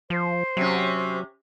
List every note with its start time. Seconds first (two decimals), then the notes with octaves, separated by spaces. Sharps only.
0.10 F3 C5
0.57 C3 F#3 C#4